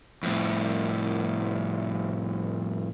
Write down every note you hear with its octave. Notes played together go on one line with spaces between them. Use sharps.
F2 A2